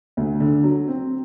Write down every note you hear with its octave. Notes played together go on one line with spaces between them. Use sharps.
D2
D3
F#3
C4